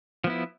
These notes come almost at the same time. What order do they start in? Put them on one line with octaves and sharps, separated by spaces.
F3 B3 E4